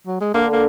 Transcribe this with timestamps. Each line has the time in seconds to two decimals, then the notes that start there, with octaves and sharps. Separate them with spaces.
0.07 F#3
0.21 G#3
0.34 D3 A#3
0.52 A#3